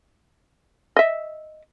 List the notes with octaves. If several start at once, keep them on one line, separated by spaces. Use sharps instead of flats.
D#5 E5